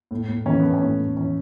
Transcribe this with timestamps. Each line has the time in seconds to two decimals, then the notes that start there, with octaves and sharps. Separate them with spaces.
0.11 A2
0.28 A2
0.46 E3 C#4
0.59 A3 B3
0.74 C#4
0.82 A2
0.99 A2
1.17 E3 C#4